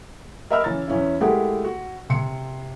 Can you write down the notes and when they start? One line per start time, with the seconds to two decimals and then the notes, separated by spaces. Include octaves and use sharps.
0.50 A#4 D#5 E5 B5 E6 F6
0.64 E3 C#4 A#5 A6
0.88 E2 C#4 E4
1.21 G#3 A3 E4 G4 A#4 F#5
1.64 F#4
2.10 C3 C6 C#7